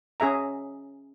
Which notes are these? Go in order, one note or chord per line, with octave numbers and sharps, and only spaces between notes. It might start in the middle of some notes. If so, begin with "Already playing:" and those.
C#4 G#4 E5 A#5